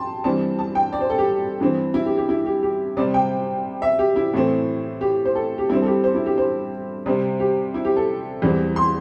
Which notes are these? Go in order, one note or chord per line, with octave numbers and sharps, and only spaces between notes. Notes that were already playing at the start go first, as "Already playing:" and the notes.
Already playing: G5 A5 C6
G2 E3 G3 C4 A5
A5
G5
D5
C5
A4
G4
G2 E3 C4
E4
G4
G4
E4
G4
G4
C3 G3 C4 D5
G5
E5
G4
E4
A2 E3 A3 C4
G4
C5
A4
G4
G2 G3 C4 E4
A4
G4
C5
E4
G4
C5
C3 G3 C4
G4
E4
G4
A4
E2 E3 G3 C4
C6